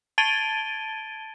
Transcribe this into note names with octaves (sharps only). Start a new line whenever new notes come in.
A5 G#6 A6 D7 D#7 G7